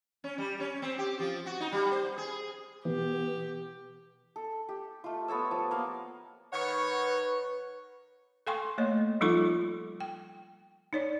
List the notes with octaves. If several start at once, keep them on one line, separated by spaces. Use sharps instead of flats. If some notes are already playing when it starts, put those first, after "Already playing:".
C#4
G3
C#4
C4
G4
F3
F#4
D#4
G3
C5
G#4
B2 E3 B3 G4
A4
G4
A3 F4
B3 A4 C#5 E6
F3
A#3 F5
D#3 D#4 B4 C#5 F#5 C#6
A4 F5 G5 G#5 C6 C#6
A3 A#3 C#5 D#5
F3 G3 D#4 F4 A4 C#6
G5
D#4 C#5 D5